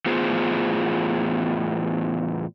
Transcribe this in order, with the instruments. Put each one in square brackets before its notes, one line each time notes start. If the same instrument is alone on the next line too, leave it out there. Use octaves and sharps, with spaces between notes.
[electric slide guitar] E2 A2 B3 F4 G#4 C5